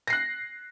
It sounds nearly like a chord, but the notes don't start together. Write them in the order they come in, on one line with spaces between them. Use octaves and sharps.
A#6 C7 F#6